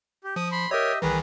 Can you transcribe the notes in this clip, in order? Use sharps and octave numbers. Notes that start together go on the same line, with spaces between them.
G4
F3 D#6
B5 C6
G4 A#4 C#5 D#5 E5
C2 D#3 E3 G#4 B4 A#5